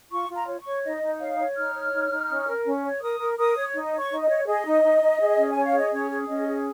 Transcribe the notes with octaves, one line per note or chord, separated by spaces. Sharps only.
F4 C#6
F4
A#5
C#5
C#6
C#5
D#4 D#5
D#4
C#5 F5
C#5
D#4 F6
C#5
D#4
D#4
C#4
A#4
C#4
C#5
A#4 D#6
A#4
A#4 D#6
C#5
D#4
C#5
C#6
D#4
D#5
C#5
G#4 D#5
D#4
D#4
D#4
G#4
C#4
C#5 G#5
F5
G#4 D#5
C#4 C#5
G#4
C#4 D#5
G#4